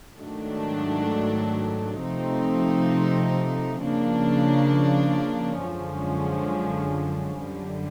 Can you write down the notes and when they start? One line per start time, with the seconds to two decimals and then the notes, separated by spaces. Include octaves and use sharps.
0.18 G#2 D#3 F#3 A3 D4
1.99 C3 F3 A3 C4 D#4
3.81 C#3 F3 A#3 D4
5.63 F#2 D3 F3 G#3 C#4
7.44 F#2 D3 G3